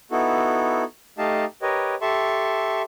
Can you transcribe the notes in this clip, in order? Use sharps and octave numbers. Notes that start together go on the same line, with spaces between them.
B3 D#4 E4 F#4 A4
A3 D#4 G4 D#5 F5 A5
G4 A#4 B4 C#5 D#5
G4 A4 E5 A5 C6 C#6